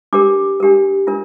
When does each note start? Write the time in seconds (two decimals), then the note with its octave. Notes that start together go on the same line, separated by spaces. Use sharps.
0.13 D4 G4 A#4 D6
0.60 D4 G4 A#4
1.07 D4 F4 A#4